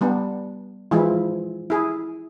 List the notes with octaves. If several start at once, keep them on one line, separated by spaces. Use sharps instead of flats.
G3 B3 D4
E3 F3 G#3 E4
E4 G#4